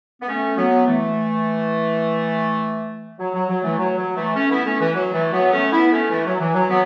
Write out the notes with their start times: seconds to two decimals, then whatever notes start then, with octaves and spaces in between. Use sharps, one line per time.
0.21 B3
0.28 A3 C#4
0.57 F#3 B3
0.86 E3 A3
3.19 F#3
3.34 F#3
3.49 F#3
3.63 E3 A3
3.78 F#3
3.97 F#3
4.16 E3 A3
4.35 A3 C#4
4.50 B3 E4
4.66 A3 C#4
4.80 E3
4.95 F#3
5.13 E3 A3
5.33 F#3 B3
5.52 A3 C#4
5.71 B3 E4
5.92 A3 C#4
6.10 E3 A3
6.26 F#3
6.40 E3
6.54 F#3
6.69 F#3 B3